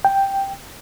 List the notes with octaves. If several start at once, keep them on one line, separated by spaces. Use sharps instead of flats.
G5